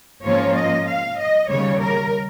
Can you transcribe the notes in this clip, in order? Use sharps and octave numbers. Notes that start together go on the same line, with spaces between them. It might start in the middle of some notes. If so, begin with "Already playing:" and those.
G#2 F3 A#3 C#4 F4 C#5
D#5
F5
D#5
D#2 C#3 G3 C#5
A#4